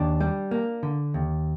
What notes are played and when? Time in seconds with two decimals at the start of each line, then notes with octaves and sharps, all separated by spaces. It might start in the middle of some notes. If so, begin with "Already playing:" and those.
Already playing: D#2 D4
0.20 G3
0.51 A#3
0.83 D3
1.14 D#2